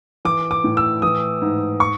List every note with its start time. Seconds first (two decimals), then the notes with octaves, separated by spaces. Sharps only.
0.25 E3 D6
0.51 D6
0.64 A2
0.77 E6
1.02 E3 D#6
1.42 G#2
1.80 C#6